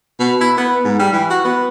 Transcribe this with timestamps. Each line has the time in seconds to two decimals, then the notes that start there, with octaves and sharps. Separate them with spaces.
0.19 B2
0.41 E4
0.57 B3
0.84 G#2
0.99 G3
1.13 E3
1.30 F#4
1.44 B3